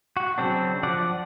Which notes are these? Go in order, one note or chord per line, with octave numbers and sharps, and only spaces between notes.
F#4
C#3 F#3 C4 D4
F3 D5 F#5